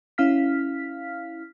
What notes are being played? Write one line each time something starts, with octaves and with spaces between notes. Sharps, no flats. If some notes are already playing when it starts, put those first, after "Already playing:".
C#4 E4 F5 F6 B6